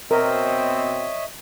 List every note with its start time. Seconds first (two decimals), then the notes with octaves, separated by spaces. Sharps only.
0.11 B2 C4 A#4 C#5 D#5 E5